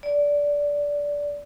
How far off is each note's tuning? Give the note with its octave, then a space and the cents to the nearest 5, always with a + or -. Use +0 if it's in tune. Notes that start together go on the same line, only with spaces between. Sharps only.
D5 -15